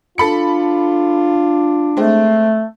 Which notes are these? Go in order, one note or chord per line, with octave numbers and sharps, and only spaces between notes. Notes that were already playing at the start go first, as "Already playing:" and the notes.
D4 F4 A4 B5 C#7
G#3 A3 C4